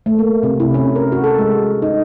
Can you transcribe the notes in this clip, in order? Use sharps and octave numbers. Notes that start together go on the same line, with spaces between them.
A3
A#3
C3
E4
C#4
A#4
F#4
A4
G#3
D#4